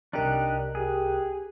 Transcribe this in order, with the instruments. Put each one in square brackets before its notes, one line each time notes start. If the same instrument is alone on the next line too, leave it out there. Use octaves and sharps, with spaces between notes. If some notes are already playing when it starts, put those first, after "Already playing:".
[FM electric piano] C2 A#4 F#6 [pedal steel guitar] D4 D#4 G4
[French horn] G4 [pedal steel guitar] G#4